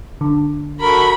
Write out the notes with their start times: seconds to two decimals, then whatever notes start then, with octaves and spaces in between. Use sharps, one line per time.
0.21 D3
0.81 F#4 A4 A#4 B5